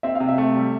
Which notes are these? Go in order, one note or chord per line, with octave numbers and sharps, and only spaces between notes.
C4 E5
F5
C3
E5
A3
G3